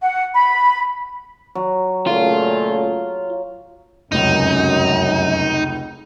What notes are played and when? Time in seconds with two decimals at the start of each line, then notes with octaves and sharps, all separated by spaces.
0.01 F#5
0.34 B5
1.55 F#3
2.07 A#2 C#3 A3 F4
4.12 F1 C#2 F#2 D#4 E7